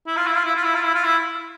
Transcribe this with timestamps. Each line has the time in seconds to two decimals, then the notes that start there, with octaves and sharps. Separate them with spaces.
0.07 E4
0.17 F4
0.26 E4
0.35 F4
0.45 E4
0.55 F4
0.64 E4
0.75 F4
0.83 E4
0.94 F4
1.04 E4